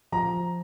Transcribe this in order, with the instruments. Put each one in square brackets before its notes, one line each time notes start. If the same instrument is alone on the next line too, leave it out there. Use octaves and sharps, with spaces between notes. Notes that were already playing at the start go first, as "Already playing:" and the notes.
[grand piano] F3 A#5